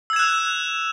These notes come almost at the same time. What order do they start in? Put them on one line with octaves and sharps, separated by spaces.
E6 G#6 E7 F#6 F7